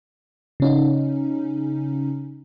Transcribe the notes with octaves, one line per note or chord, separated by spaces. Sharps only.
C#3 C#4 D#4